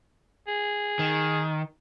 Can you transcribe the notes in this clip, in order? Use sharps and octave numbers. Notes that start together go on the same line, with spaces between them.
G#4
D#3